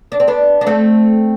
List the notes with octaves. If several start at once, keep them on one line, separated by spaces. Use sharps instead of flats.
D4
C4
B3 D4
D4
A3 C4